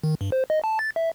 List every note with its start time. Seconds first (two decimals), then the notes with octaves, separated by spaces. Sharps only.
0.03 D#3
0.21 G2
0.32 C5
0.50 D#5
0.64 A5
0.79 A6
0.96 E5